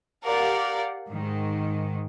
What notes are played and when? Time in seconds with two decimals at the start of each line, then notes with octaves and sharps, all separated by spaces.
0.25 G4 A#4 D5 F5 F#5
1.08 G#2 D#3